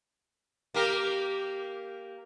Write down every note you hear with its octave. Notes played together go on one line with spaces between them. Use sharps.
A#3 G4 A#4